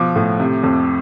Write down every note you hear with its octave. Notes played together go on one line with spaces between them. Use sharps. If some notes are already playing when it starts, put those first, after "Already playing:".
Already playing: B2 F3 D6
A2
C3
F2